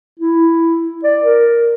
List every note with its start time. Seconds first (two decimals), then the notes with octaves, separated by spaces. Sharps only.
0.20 E4
1.04 D5
1.24 A#4